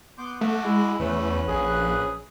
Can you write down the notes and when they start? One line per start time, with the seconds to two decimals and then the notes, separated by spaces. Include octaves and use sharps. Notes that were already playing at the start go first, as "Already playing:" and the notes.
0.18 B3 C6 D6 G6
0.41 A3 F#4 D6
0.64 G#3 E4
1.00 E2 A3 C#4 B4 F#6
1.48 A#1 G#4